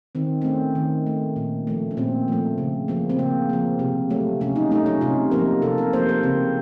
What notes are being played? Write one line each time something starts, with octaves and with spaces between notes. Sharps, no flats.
D#3 C4
C4
A3 C#4
D#3
A3
A#2
F3 A3
C#4
A#2 C4
F3 A3
C#3
F3 A#3
C4
C#3 A#3
F3 A#3
C3
F#3 A3
C3 C#4
D#4
F#3 A3 D#4
C#4
C3 F4
F3 A#3 A#4
C3 A4
A#4
F3 A#3 C5
A#4
C#3 C4